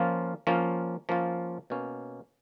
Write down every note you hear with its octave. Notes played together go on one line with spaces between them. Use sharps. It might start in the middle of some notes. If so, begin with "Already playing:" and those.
Already playing: F3 A#3 C#4 F4
F3 A#3 C#4 F4
F3 A#3 C#4 F4
B2 A#3 C#4